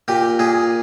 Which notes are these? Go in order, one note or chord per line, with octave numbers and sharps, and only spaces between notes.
A#2 G4
A#2 G#4